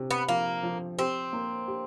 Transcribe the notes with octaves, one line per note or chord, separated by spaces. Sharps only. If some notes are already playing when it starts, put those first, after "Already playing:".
Already playing: C3
B3
F3 A#3
F3
C4 G4
A#3
G4